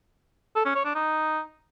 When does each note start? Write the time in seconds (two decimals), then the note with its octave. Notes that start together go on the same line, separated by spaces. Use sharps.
0.56 A4
0.66 C#4
0.75 C#5
0.85 D4
0.95 D#4